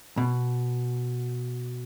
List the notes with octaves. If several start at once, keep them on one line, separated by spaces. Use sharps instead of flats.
B2